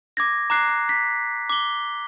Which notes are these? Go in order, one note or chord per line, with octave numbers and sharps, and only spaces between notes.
D6 G#6 A#6
A#5 D6 F#6 C7
B6
D6 G7